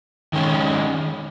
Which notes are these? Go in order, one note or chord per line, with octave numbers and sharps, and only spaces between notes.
D#3 G#3 C#4